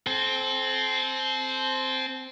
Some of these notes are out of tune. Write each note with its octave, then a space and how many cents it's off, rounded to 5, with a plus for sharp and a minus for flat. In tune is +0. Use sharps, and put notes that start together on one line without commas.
C4 +0 A4 -40